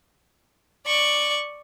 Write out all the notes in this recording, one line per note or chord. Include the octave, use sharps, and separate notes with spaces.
D5 C#6